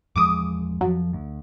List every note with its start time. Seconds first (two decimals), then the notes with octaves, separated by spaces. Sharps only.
0.16 E2 F3 G#3 D6 D#6
0.81 F2 F3 F#3
1.13 D2